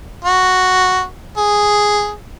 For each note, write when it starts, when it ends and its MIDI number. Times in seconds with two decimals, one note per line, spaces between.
0.24 1.04 66
1.37 2.11 68